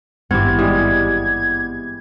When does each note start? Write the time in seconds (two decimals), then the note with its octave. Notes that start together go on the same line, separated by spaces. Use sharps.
0.31 G#1 G2 B3 C4 E4 G4 G#6
0.59 E3 G3 G#3